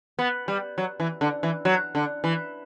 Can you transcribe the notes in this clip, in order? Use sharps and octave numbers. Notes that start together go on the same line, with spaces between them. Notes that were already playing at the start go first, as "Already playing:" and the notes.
B3
G3
F#3
E3
D3
E3
F#3
D3
E3